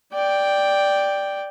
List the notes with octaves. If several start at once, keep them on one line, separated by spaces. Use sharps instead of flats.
D5 G5